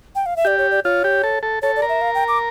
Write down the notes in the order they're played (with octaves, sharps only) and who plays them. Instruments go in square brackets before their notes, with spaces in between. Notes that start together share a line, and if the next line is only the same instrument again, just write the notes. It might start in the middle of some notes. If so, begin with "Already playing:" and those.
[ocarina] G5
F5
E5
[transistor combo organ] G4 [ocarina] D5
[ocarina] C#5
D5
[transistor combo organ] F4 [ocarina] C#5
[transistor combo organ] G4
A4
A4
[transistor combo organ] A4 [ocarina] C#5
[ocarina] D5
[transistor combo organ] A#4
[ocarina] E5
F5
G5
D6